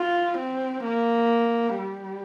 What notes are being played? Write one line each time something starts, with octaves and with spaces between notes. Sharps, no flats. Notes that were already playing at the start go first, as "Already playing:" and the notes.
Already playing: F4
C4
A#3
G3